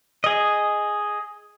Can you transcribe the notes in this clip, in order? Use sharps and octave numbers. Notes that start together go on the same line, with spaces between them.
G#4 D#5